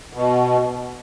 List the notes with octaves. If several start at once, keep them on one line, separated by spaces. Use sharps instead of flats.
B2